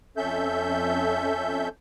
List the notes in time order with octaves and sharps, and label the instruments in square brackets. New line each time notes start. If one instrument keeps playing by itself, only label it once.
[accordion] F2 C#4 A4 E5 G6